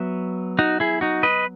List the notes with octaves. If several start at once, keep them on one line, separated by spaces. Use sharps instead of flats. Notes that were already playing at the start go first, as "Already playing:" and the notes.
Already playing: F#3 B3 E5
D#4 F#4
E4 G#4
D#4 F#4
B4 D#5